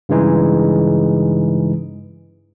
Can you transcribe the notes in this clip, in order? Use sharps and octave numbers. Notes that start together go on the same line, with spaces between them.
G2 C#3 E3 G#3 D#4